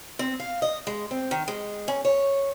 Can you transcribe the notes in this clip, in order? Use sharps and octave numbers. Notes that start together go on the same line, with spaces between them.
C4
F5
D#5
G#3
C4
D#3
G#3
C#4
C#5